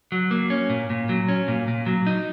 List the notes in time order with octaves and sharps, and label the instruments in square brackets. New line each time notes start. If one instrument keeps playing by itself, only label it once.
[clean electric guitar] F#3
A#3
C#4
A#2
A#2
F#3
C#4
A#2
A#2
F#3
D#4